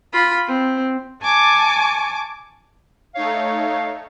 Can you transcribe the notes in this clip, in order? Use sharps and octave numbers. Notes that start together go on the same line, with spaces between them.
F4 B5
C4
G#5 A5 C#6 D6
A3 D#4 C#5 F5